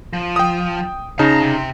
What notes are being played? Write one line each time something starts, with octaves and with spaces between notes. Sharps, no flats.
F3
G5 D#6
C#3 D#4 A5 A#5
C3